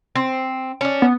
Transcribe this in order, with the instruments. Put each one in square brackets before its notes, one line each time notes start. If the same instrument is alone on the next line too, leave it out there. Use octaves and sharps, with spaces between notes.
[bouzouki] C4
C#4 D4
[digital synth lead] B3